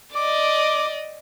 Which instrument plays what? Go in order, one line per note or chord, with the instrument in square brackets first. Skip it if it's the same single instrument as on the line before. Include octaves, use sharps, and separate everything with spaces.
[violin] D5 D#5 [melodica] D6